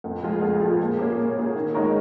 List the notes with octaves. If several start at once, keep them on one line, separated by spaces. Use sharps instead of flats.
F2
F3 G#3 F4 G#4
F2
F3 G#3 F4 G#4
A#2
A#3 C#4 G#4
A#2
A#3 C#4 G#4
D#3
G#3 D#4 A#4 C#5